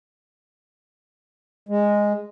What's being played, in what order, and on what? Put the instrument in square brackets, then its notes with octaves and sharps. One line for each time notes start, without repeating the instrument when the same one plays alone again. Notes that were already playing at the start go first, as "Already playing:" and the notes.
[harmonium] G#3